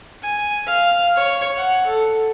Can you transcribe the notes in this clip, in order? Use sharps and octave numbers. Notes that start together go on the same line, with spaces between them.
G#5
F5
C#5
F#5
A4